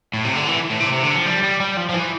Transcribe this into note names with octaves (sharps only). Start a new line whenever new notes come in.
A2
C3
D3
E3
A2
C3
C3
D3
F3
G3
G3
G3
F3
F3
E3